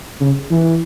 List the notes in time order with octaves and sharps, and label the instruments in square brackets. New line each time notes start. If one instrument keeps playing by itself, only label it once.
[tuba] C#3
E3